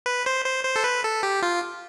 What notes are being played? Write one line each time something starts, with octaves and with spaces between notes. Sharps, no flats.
B4
C5
C5
C5
A4
B4
A4
G4
F4